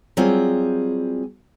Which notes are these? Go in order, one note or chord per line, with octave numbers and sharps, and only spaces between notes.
F#3 G3 C4 F4 G#4